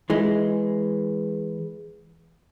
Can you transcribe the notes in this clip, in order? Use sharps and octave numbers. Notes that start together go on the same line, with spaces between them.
E3 G#3